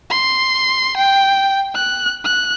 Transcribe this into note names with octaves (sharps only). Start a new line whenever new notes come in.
C6
G5
F#6
F#6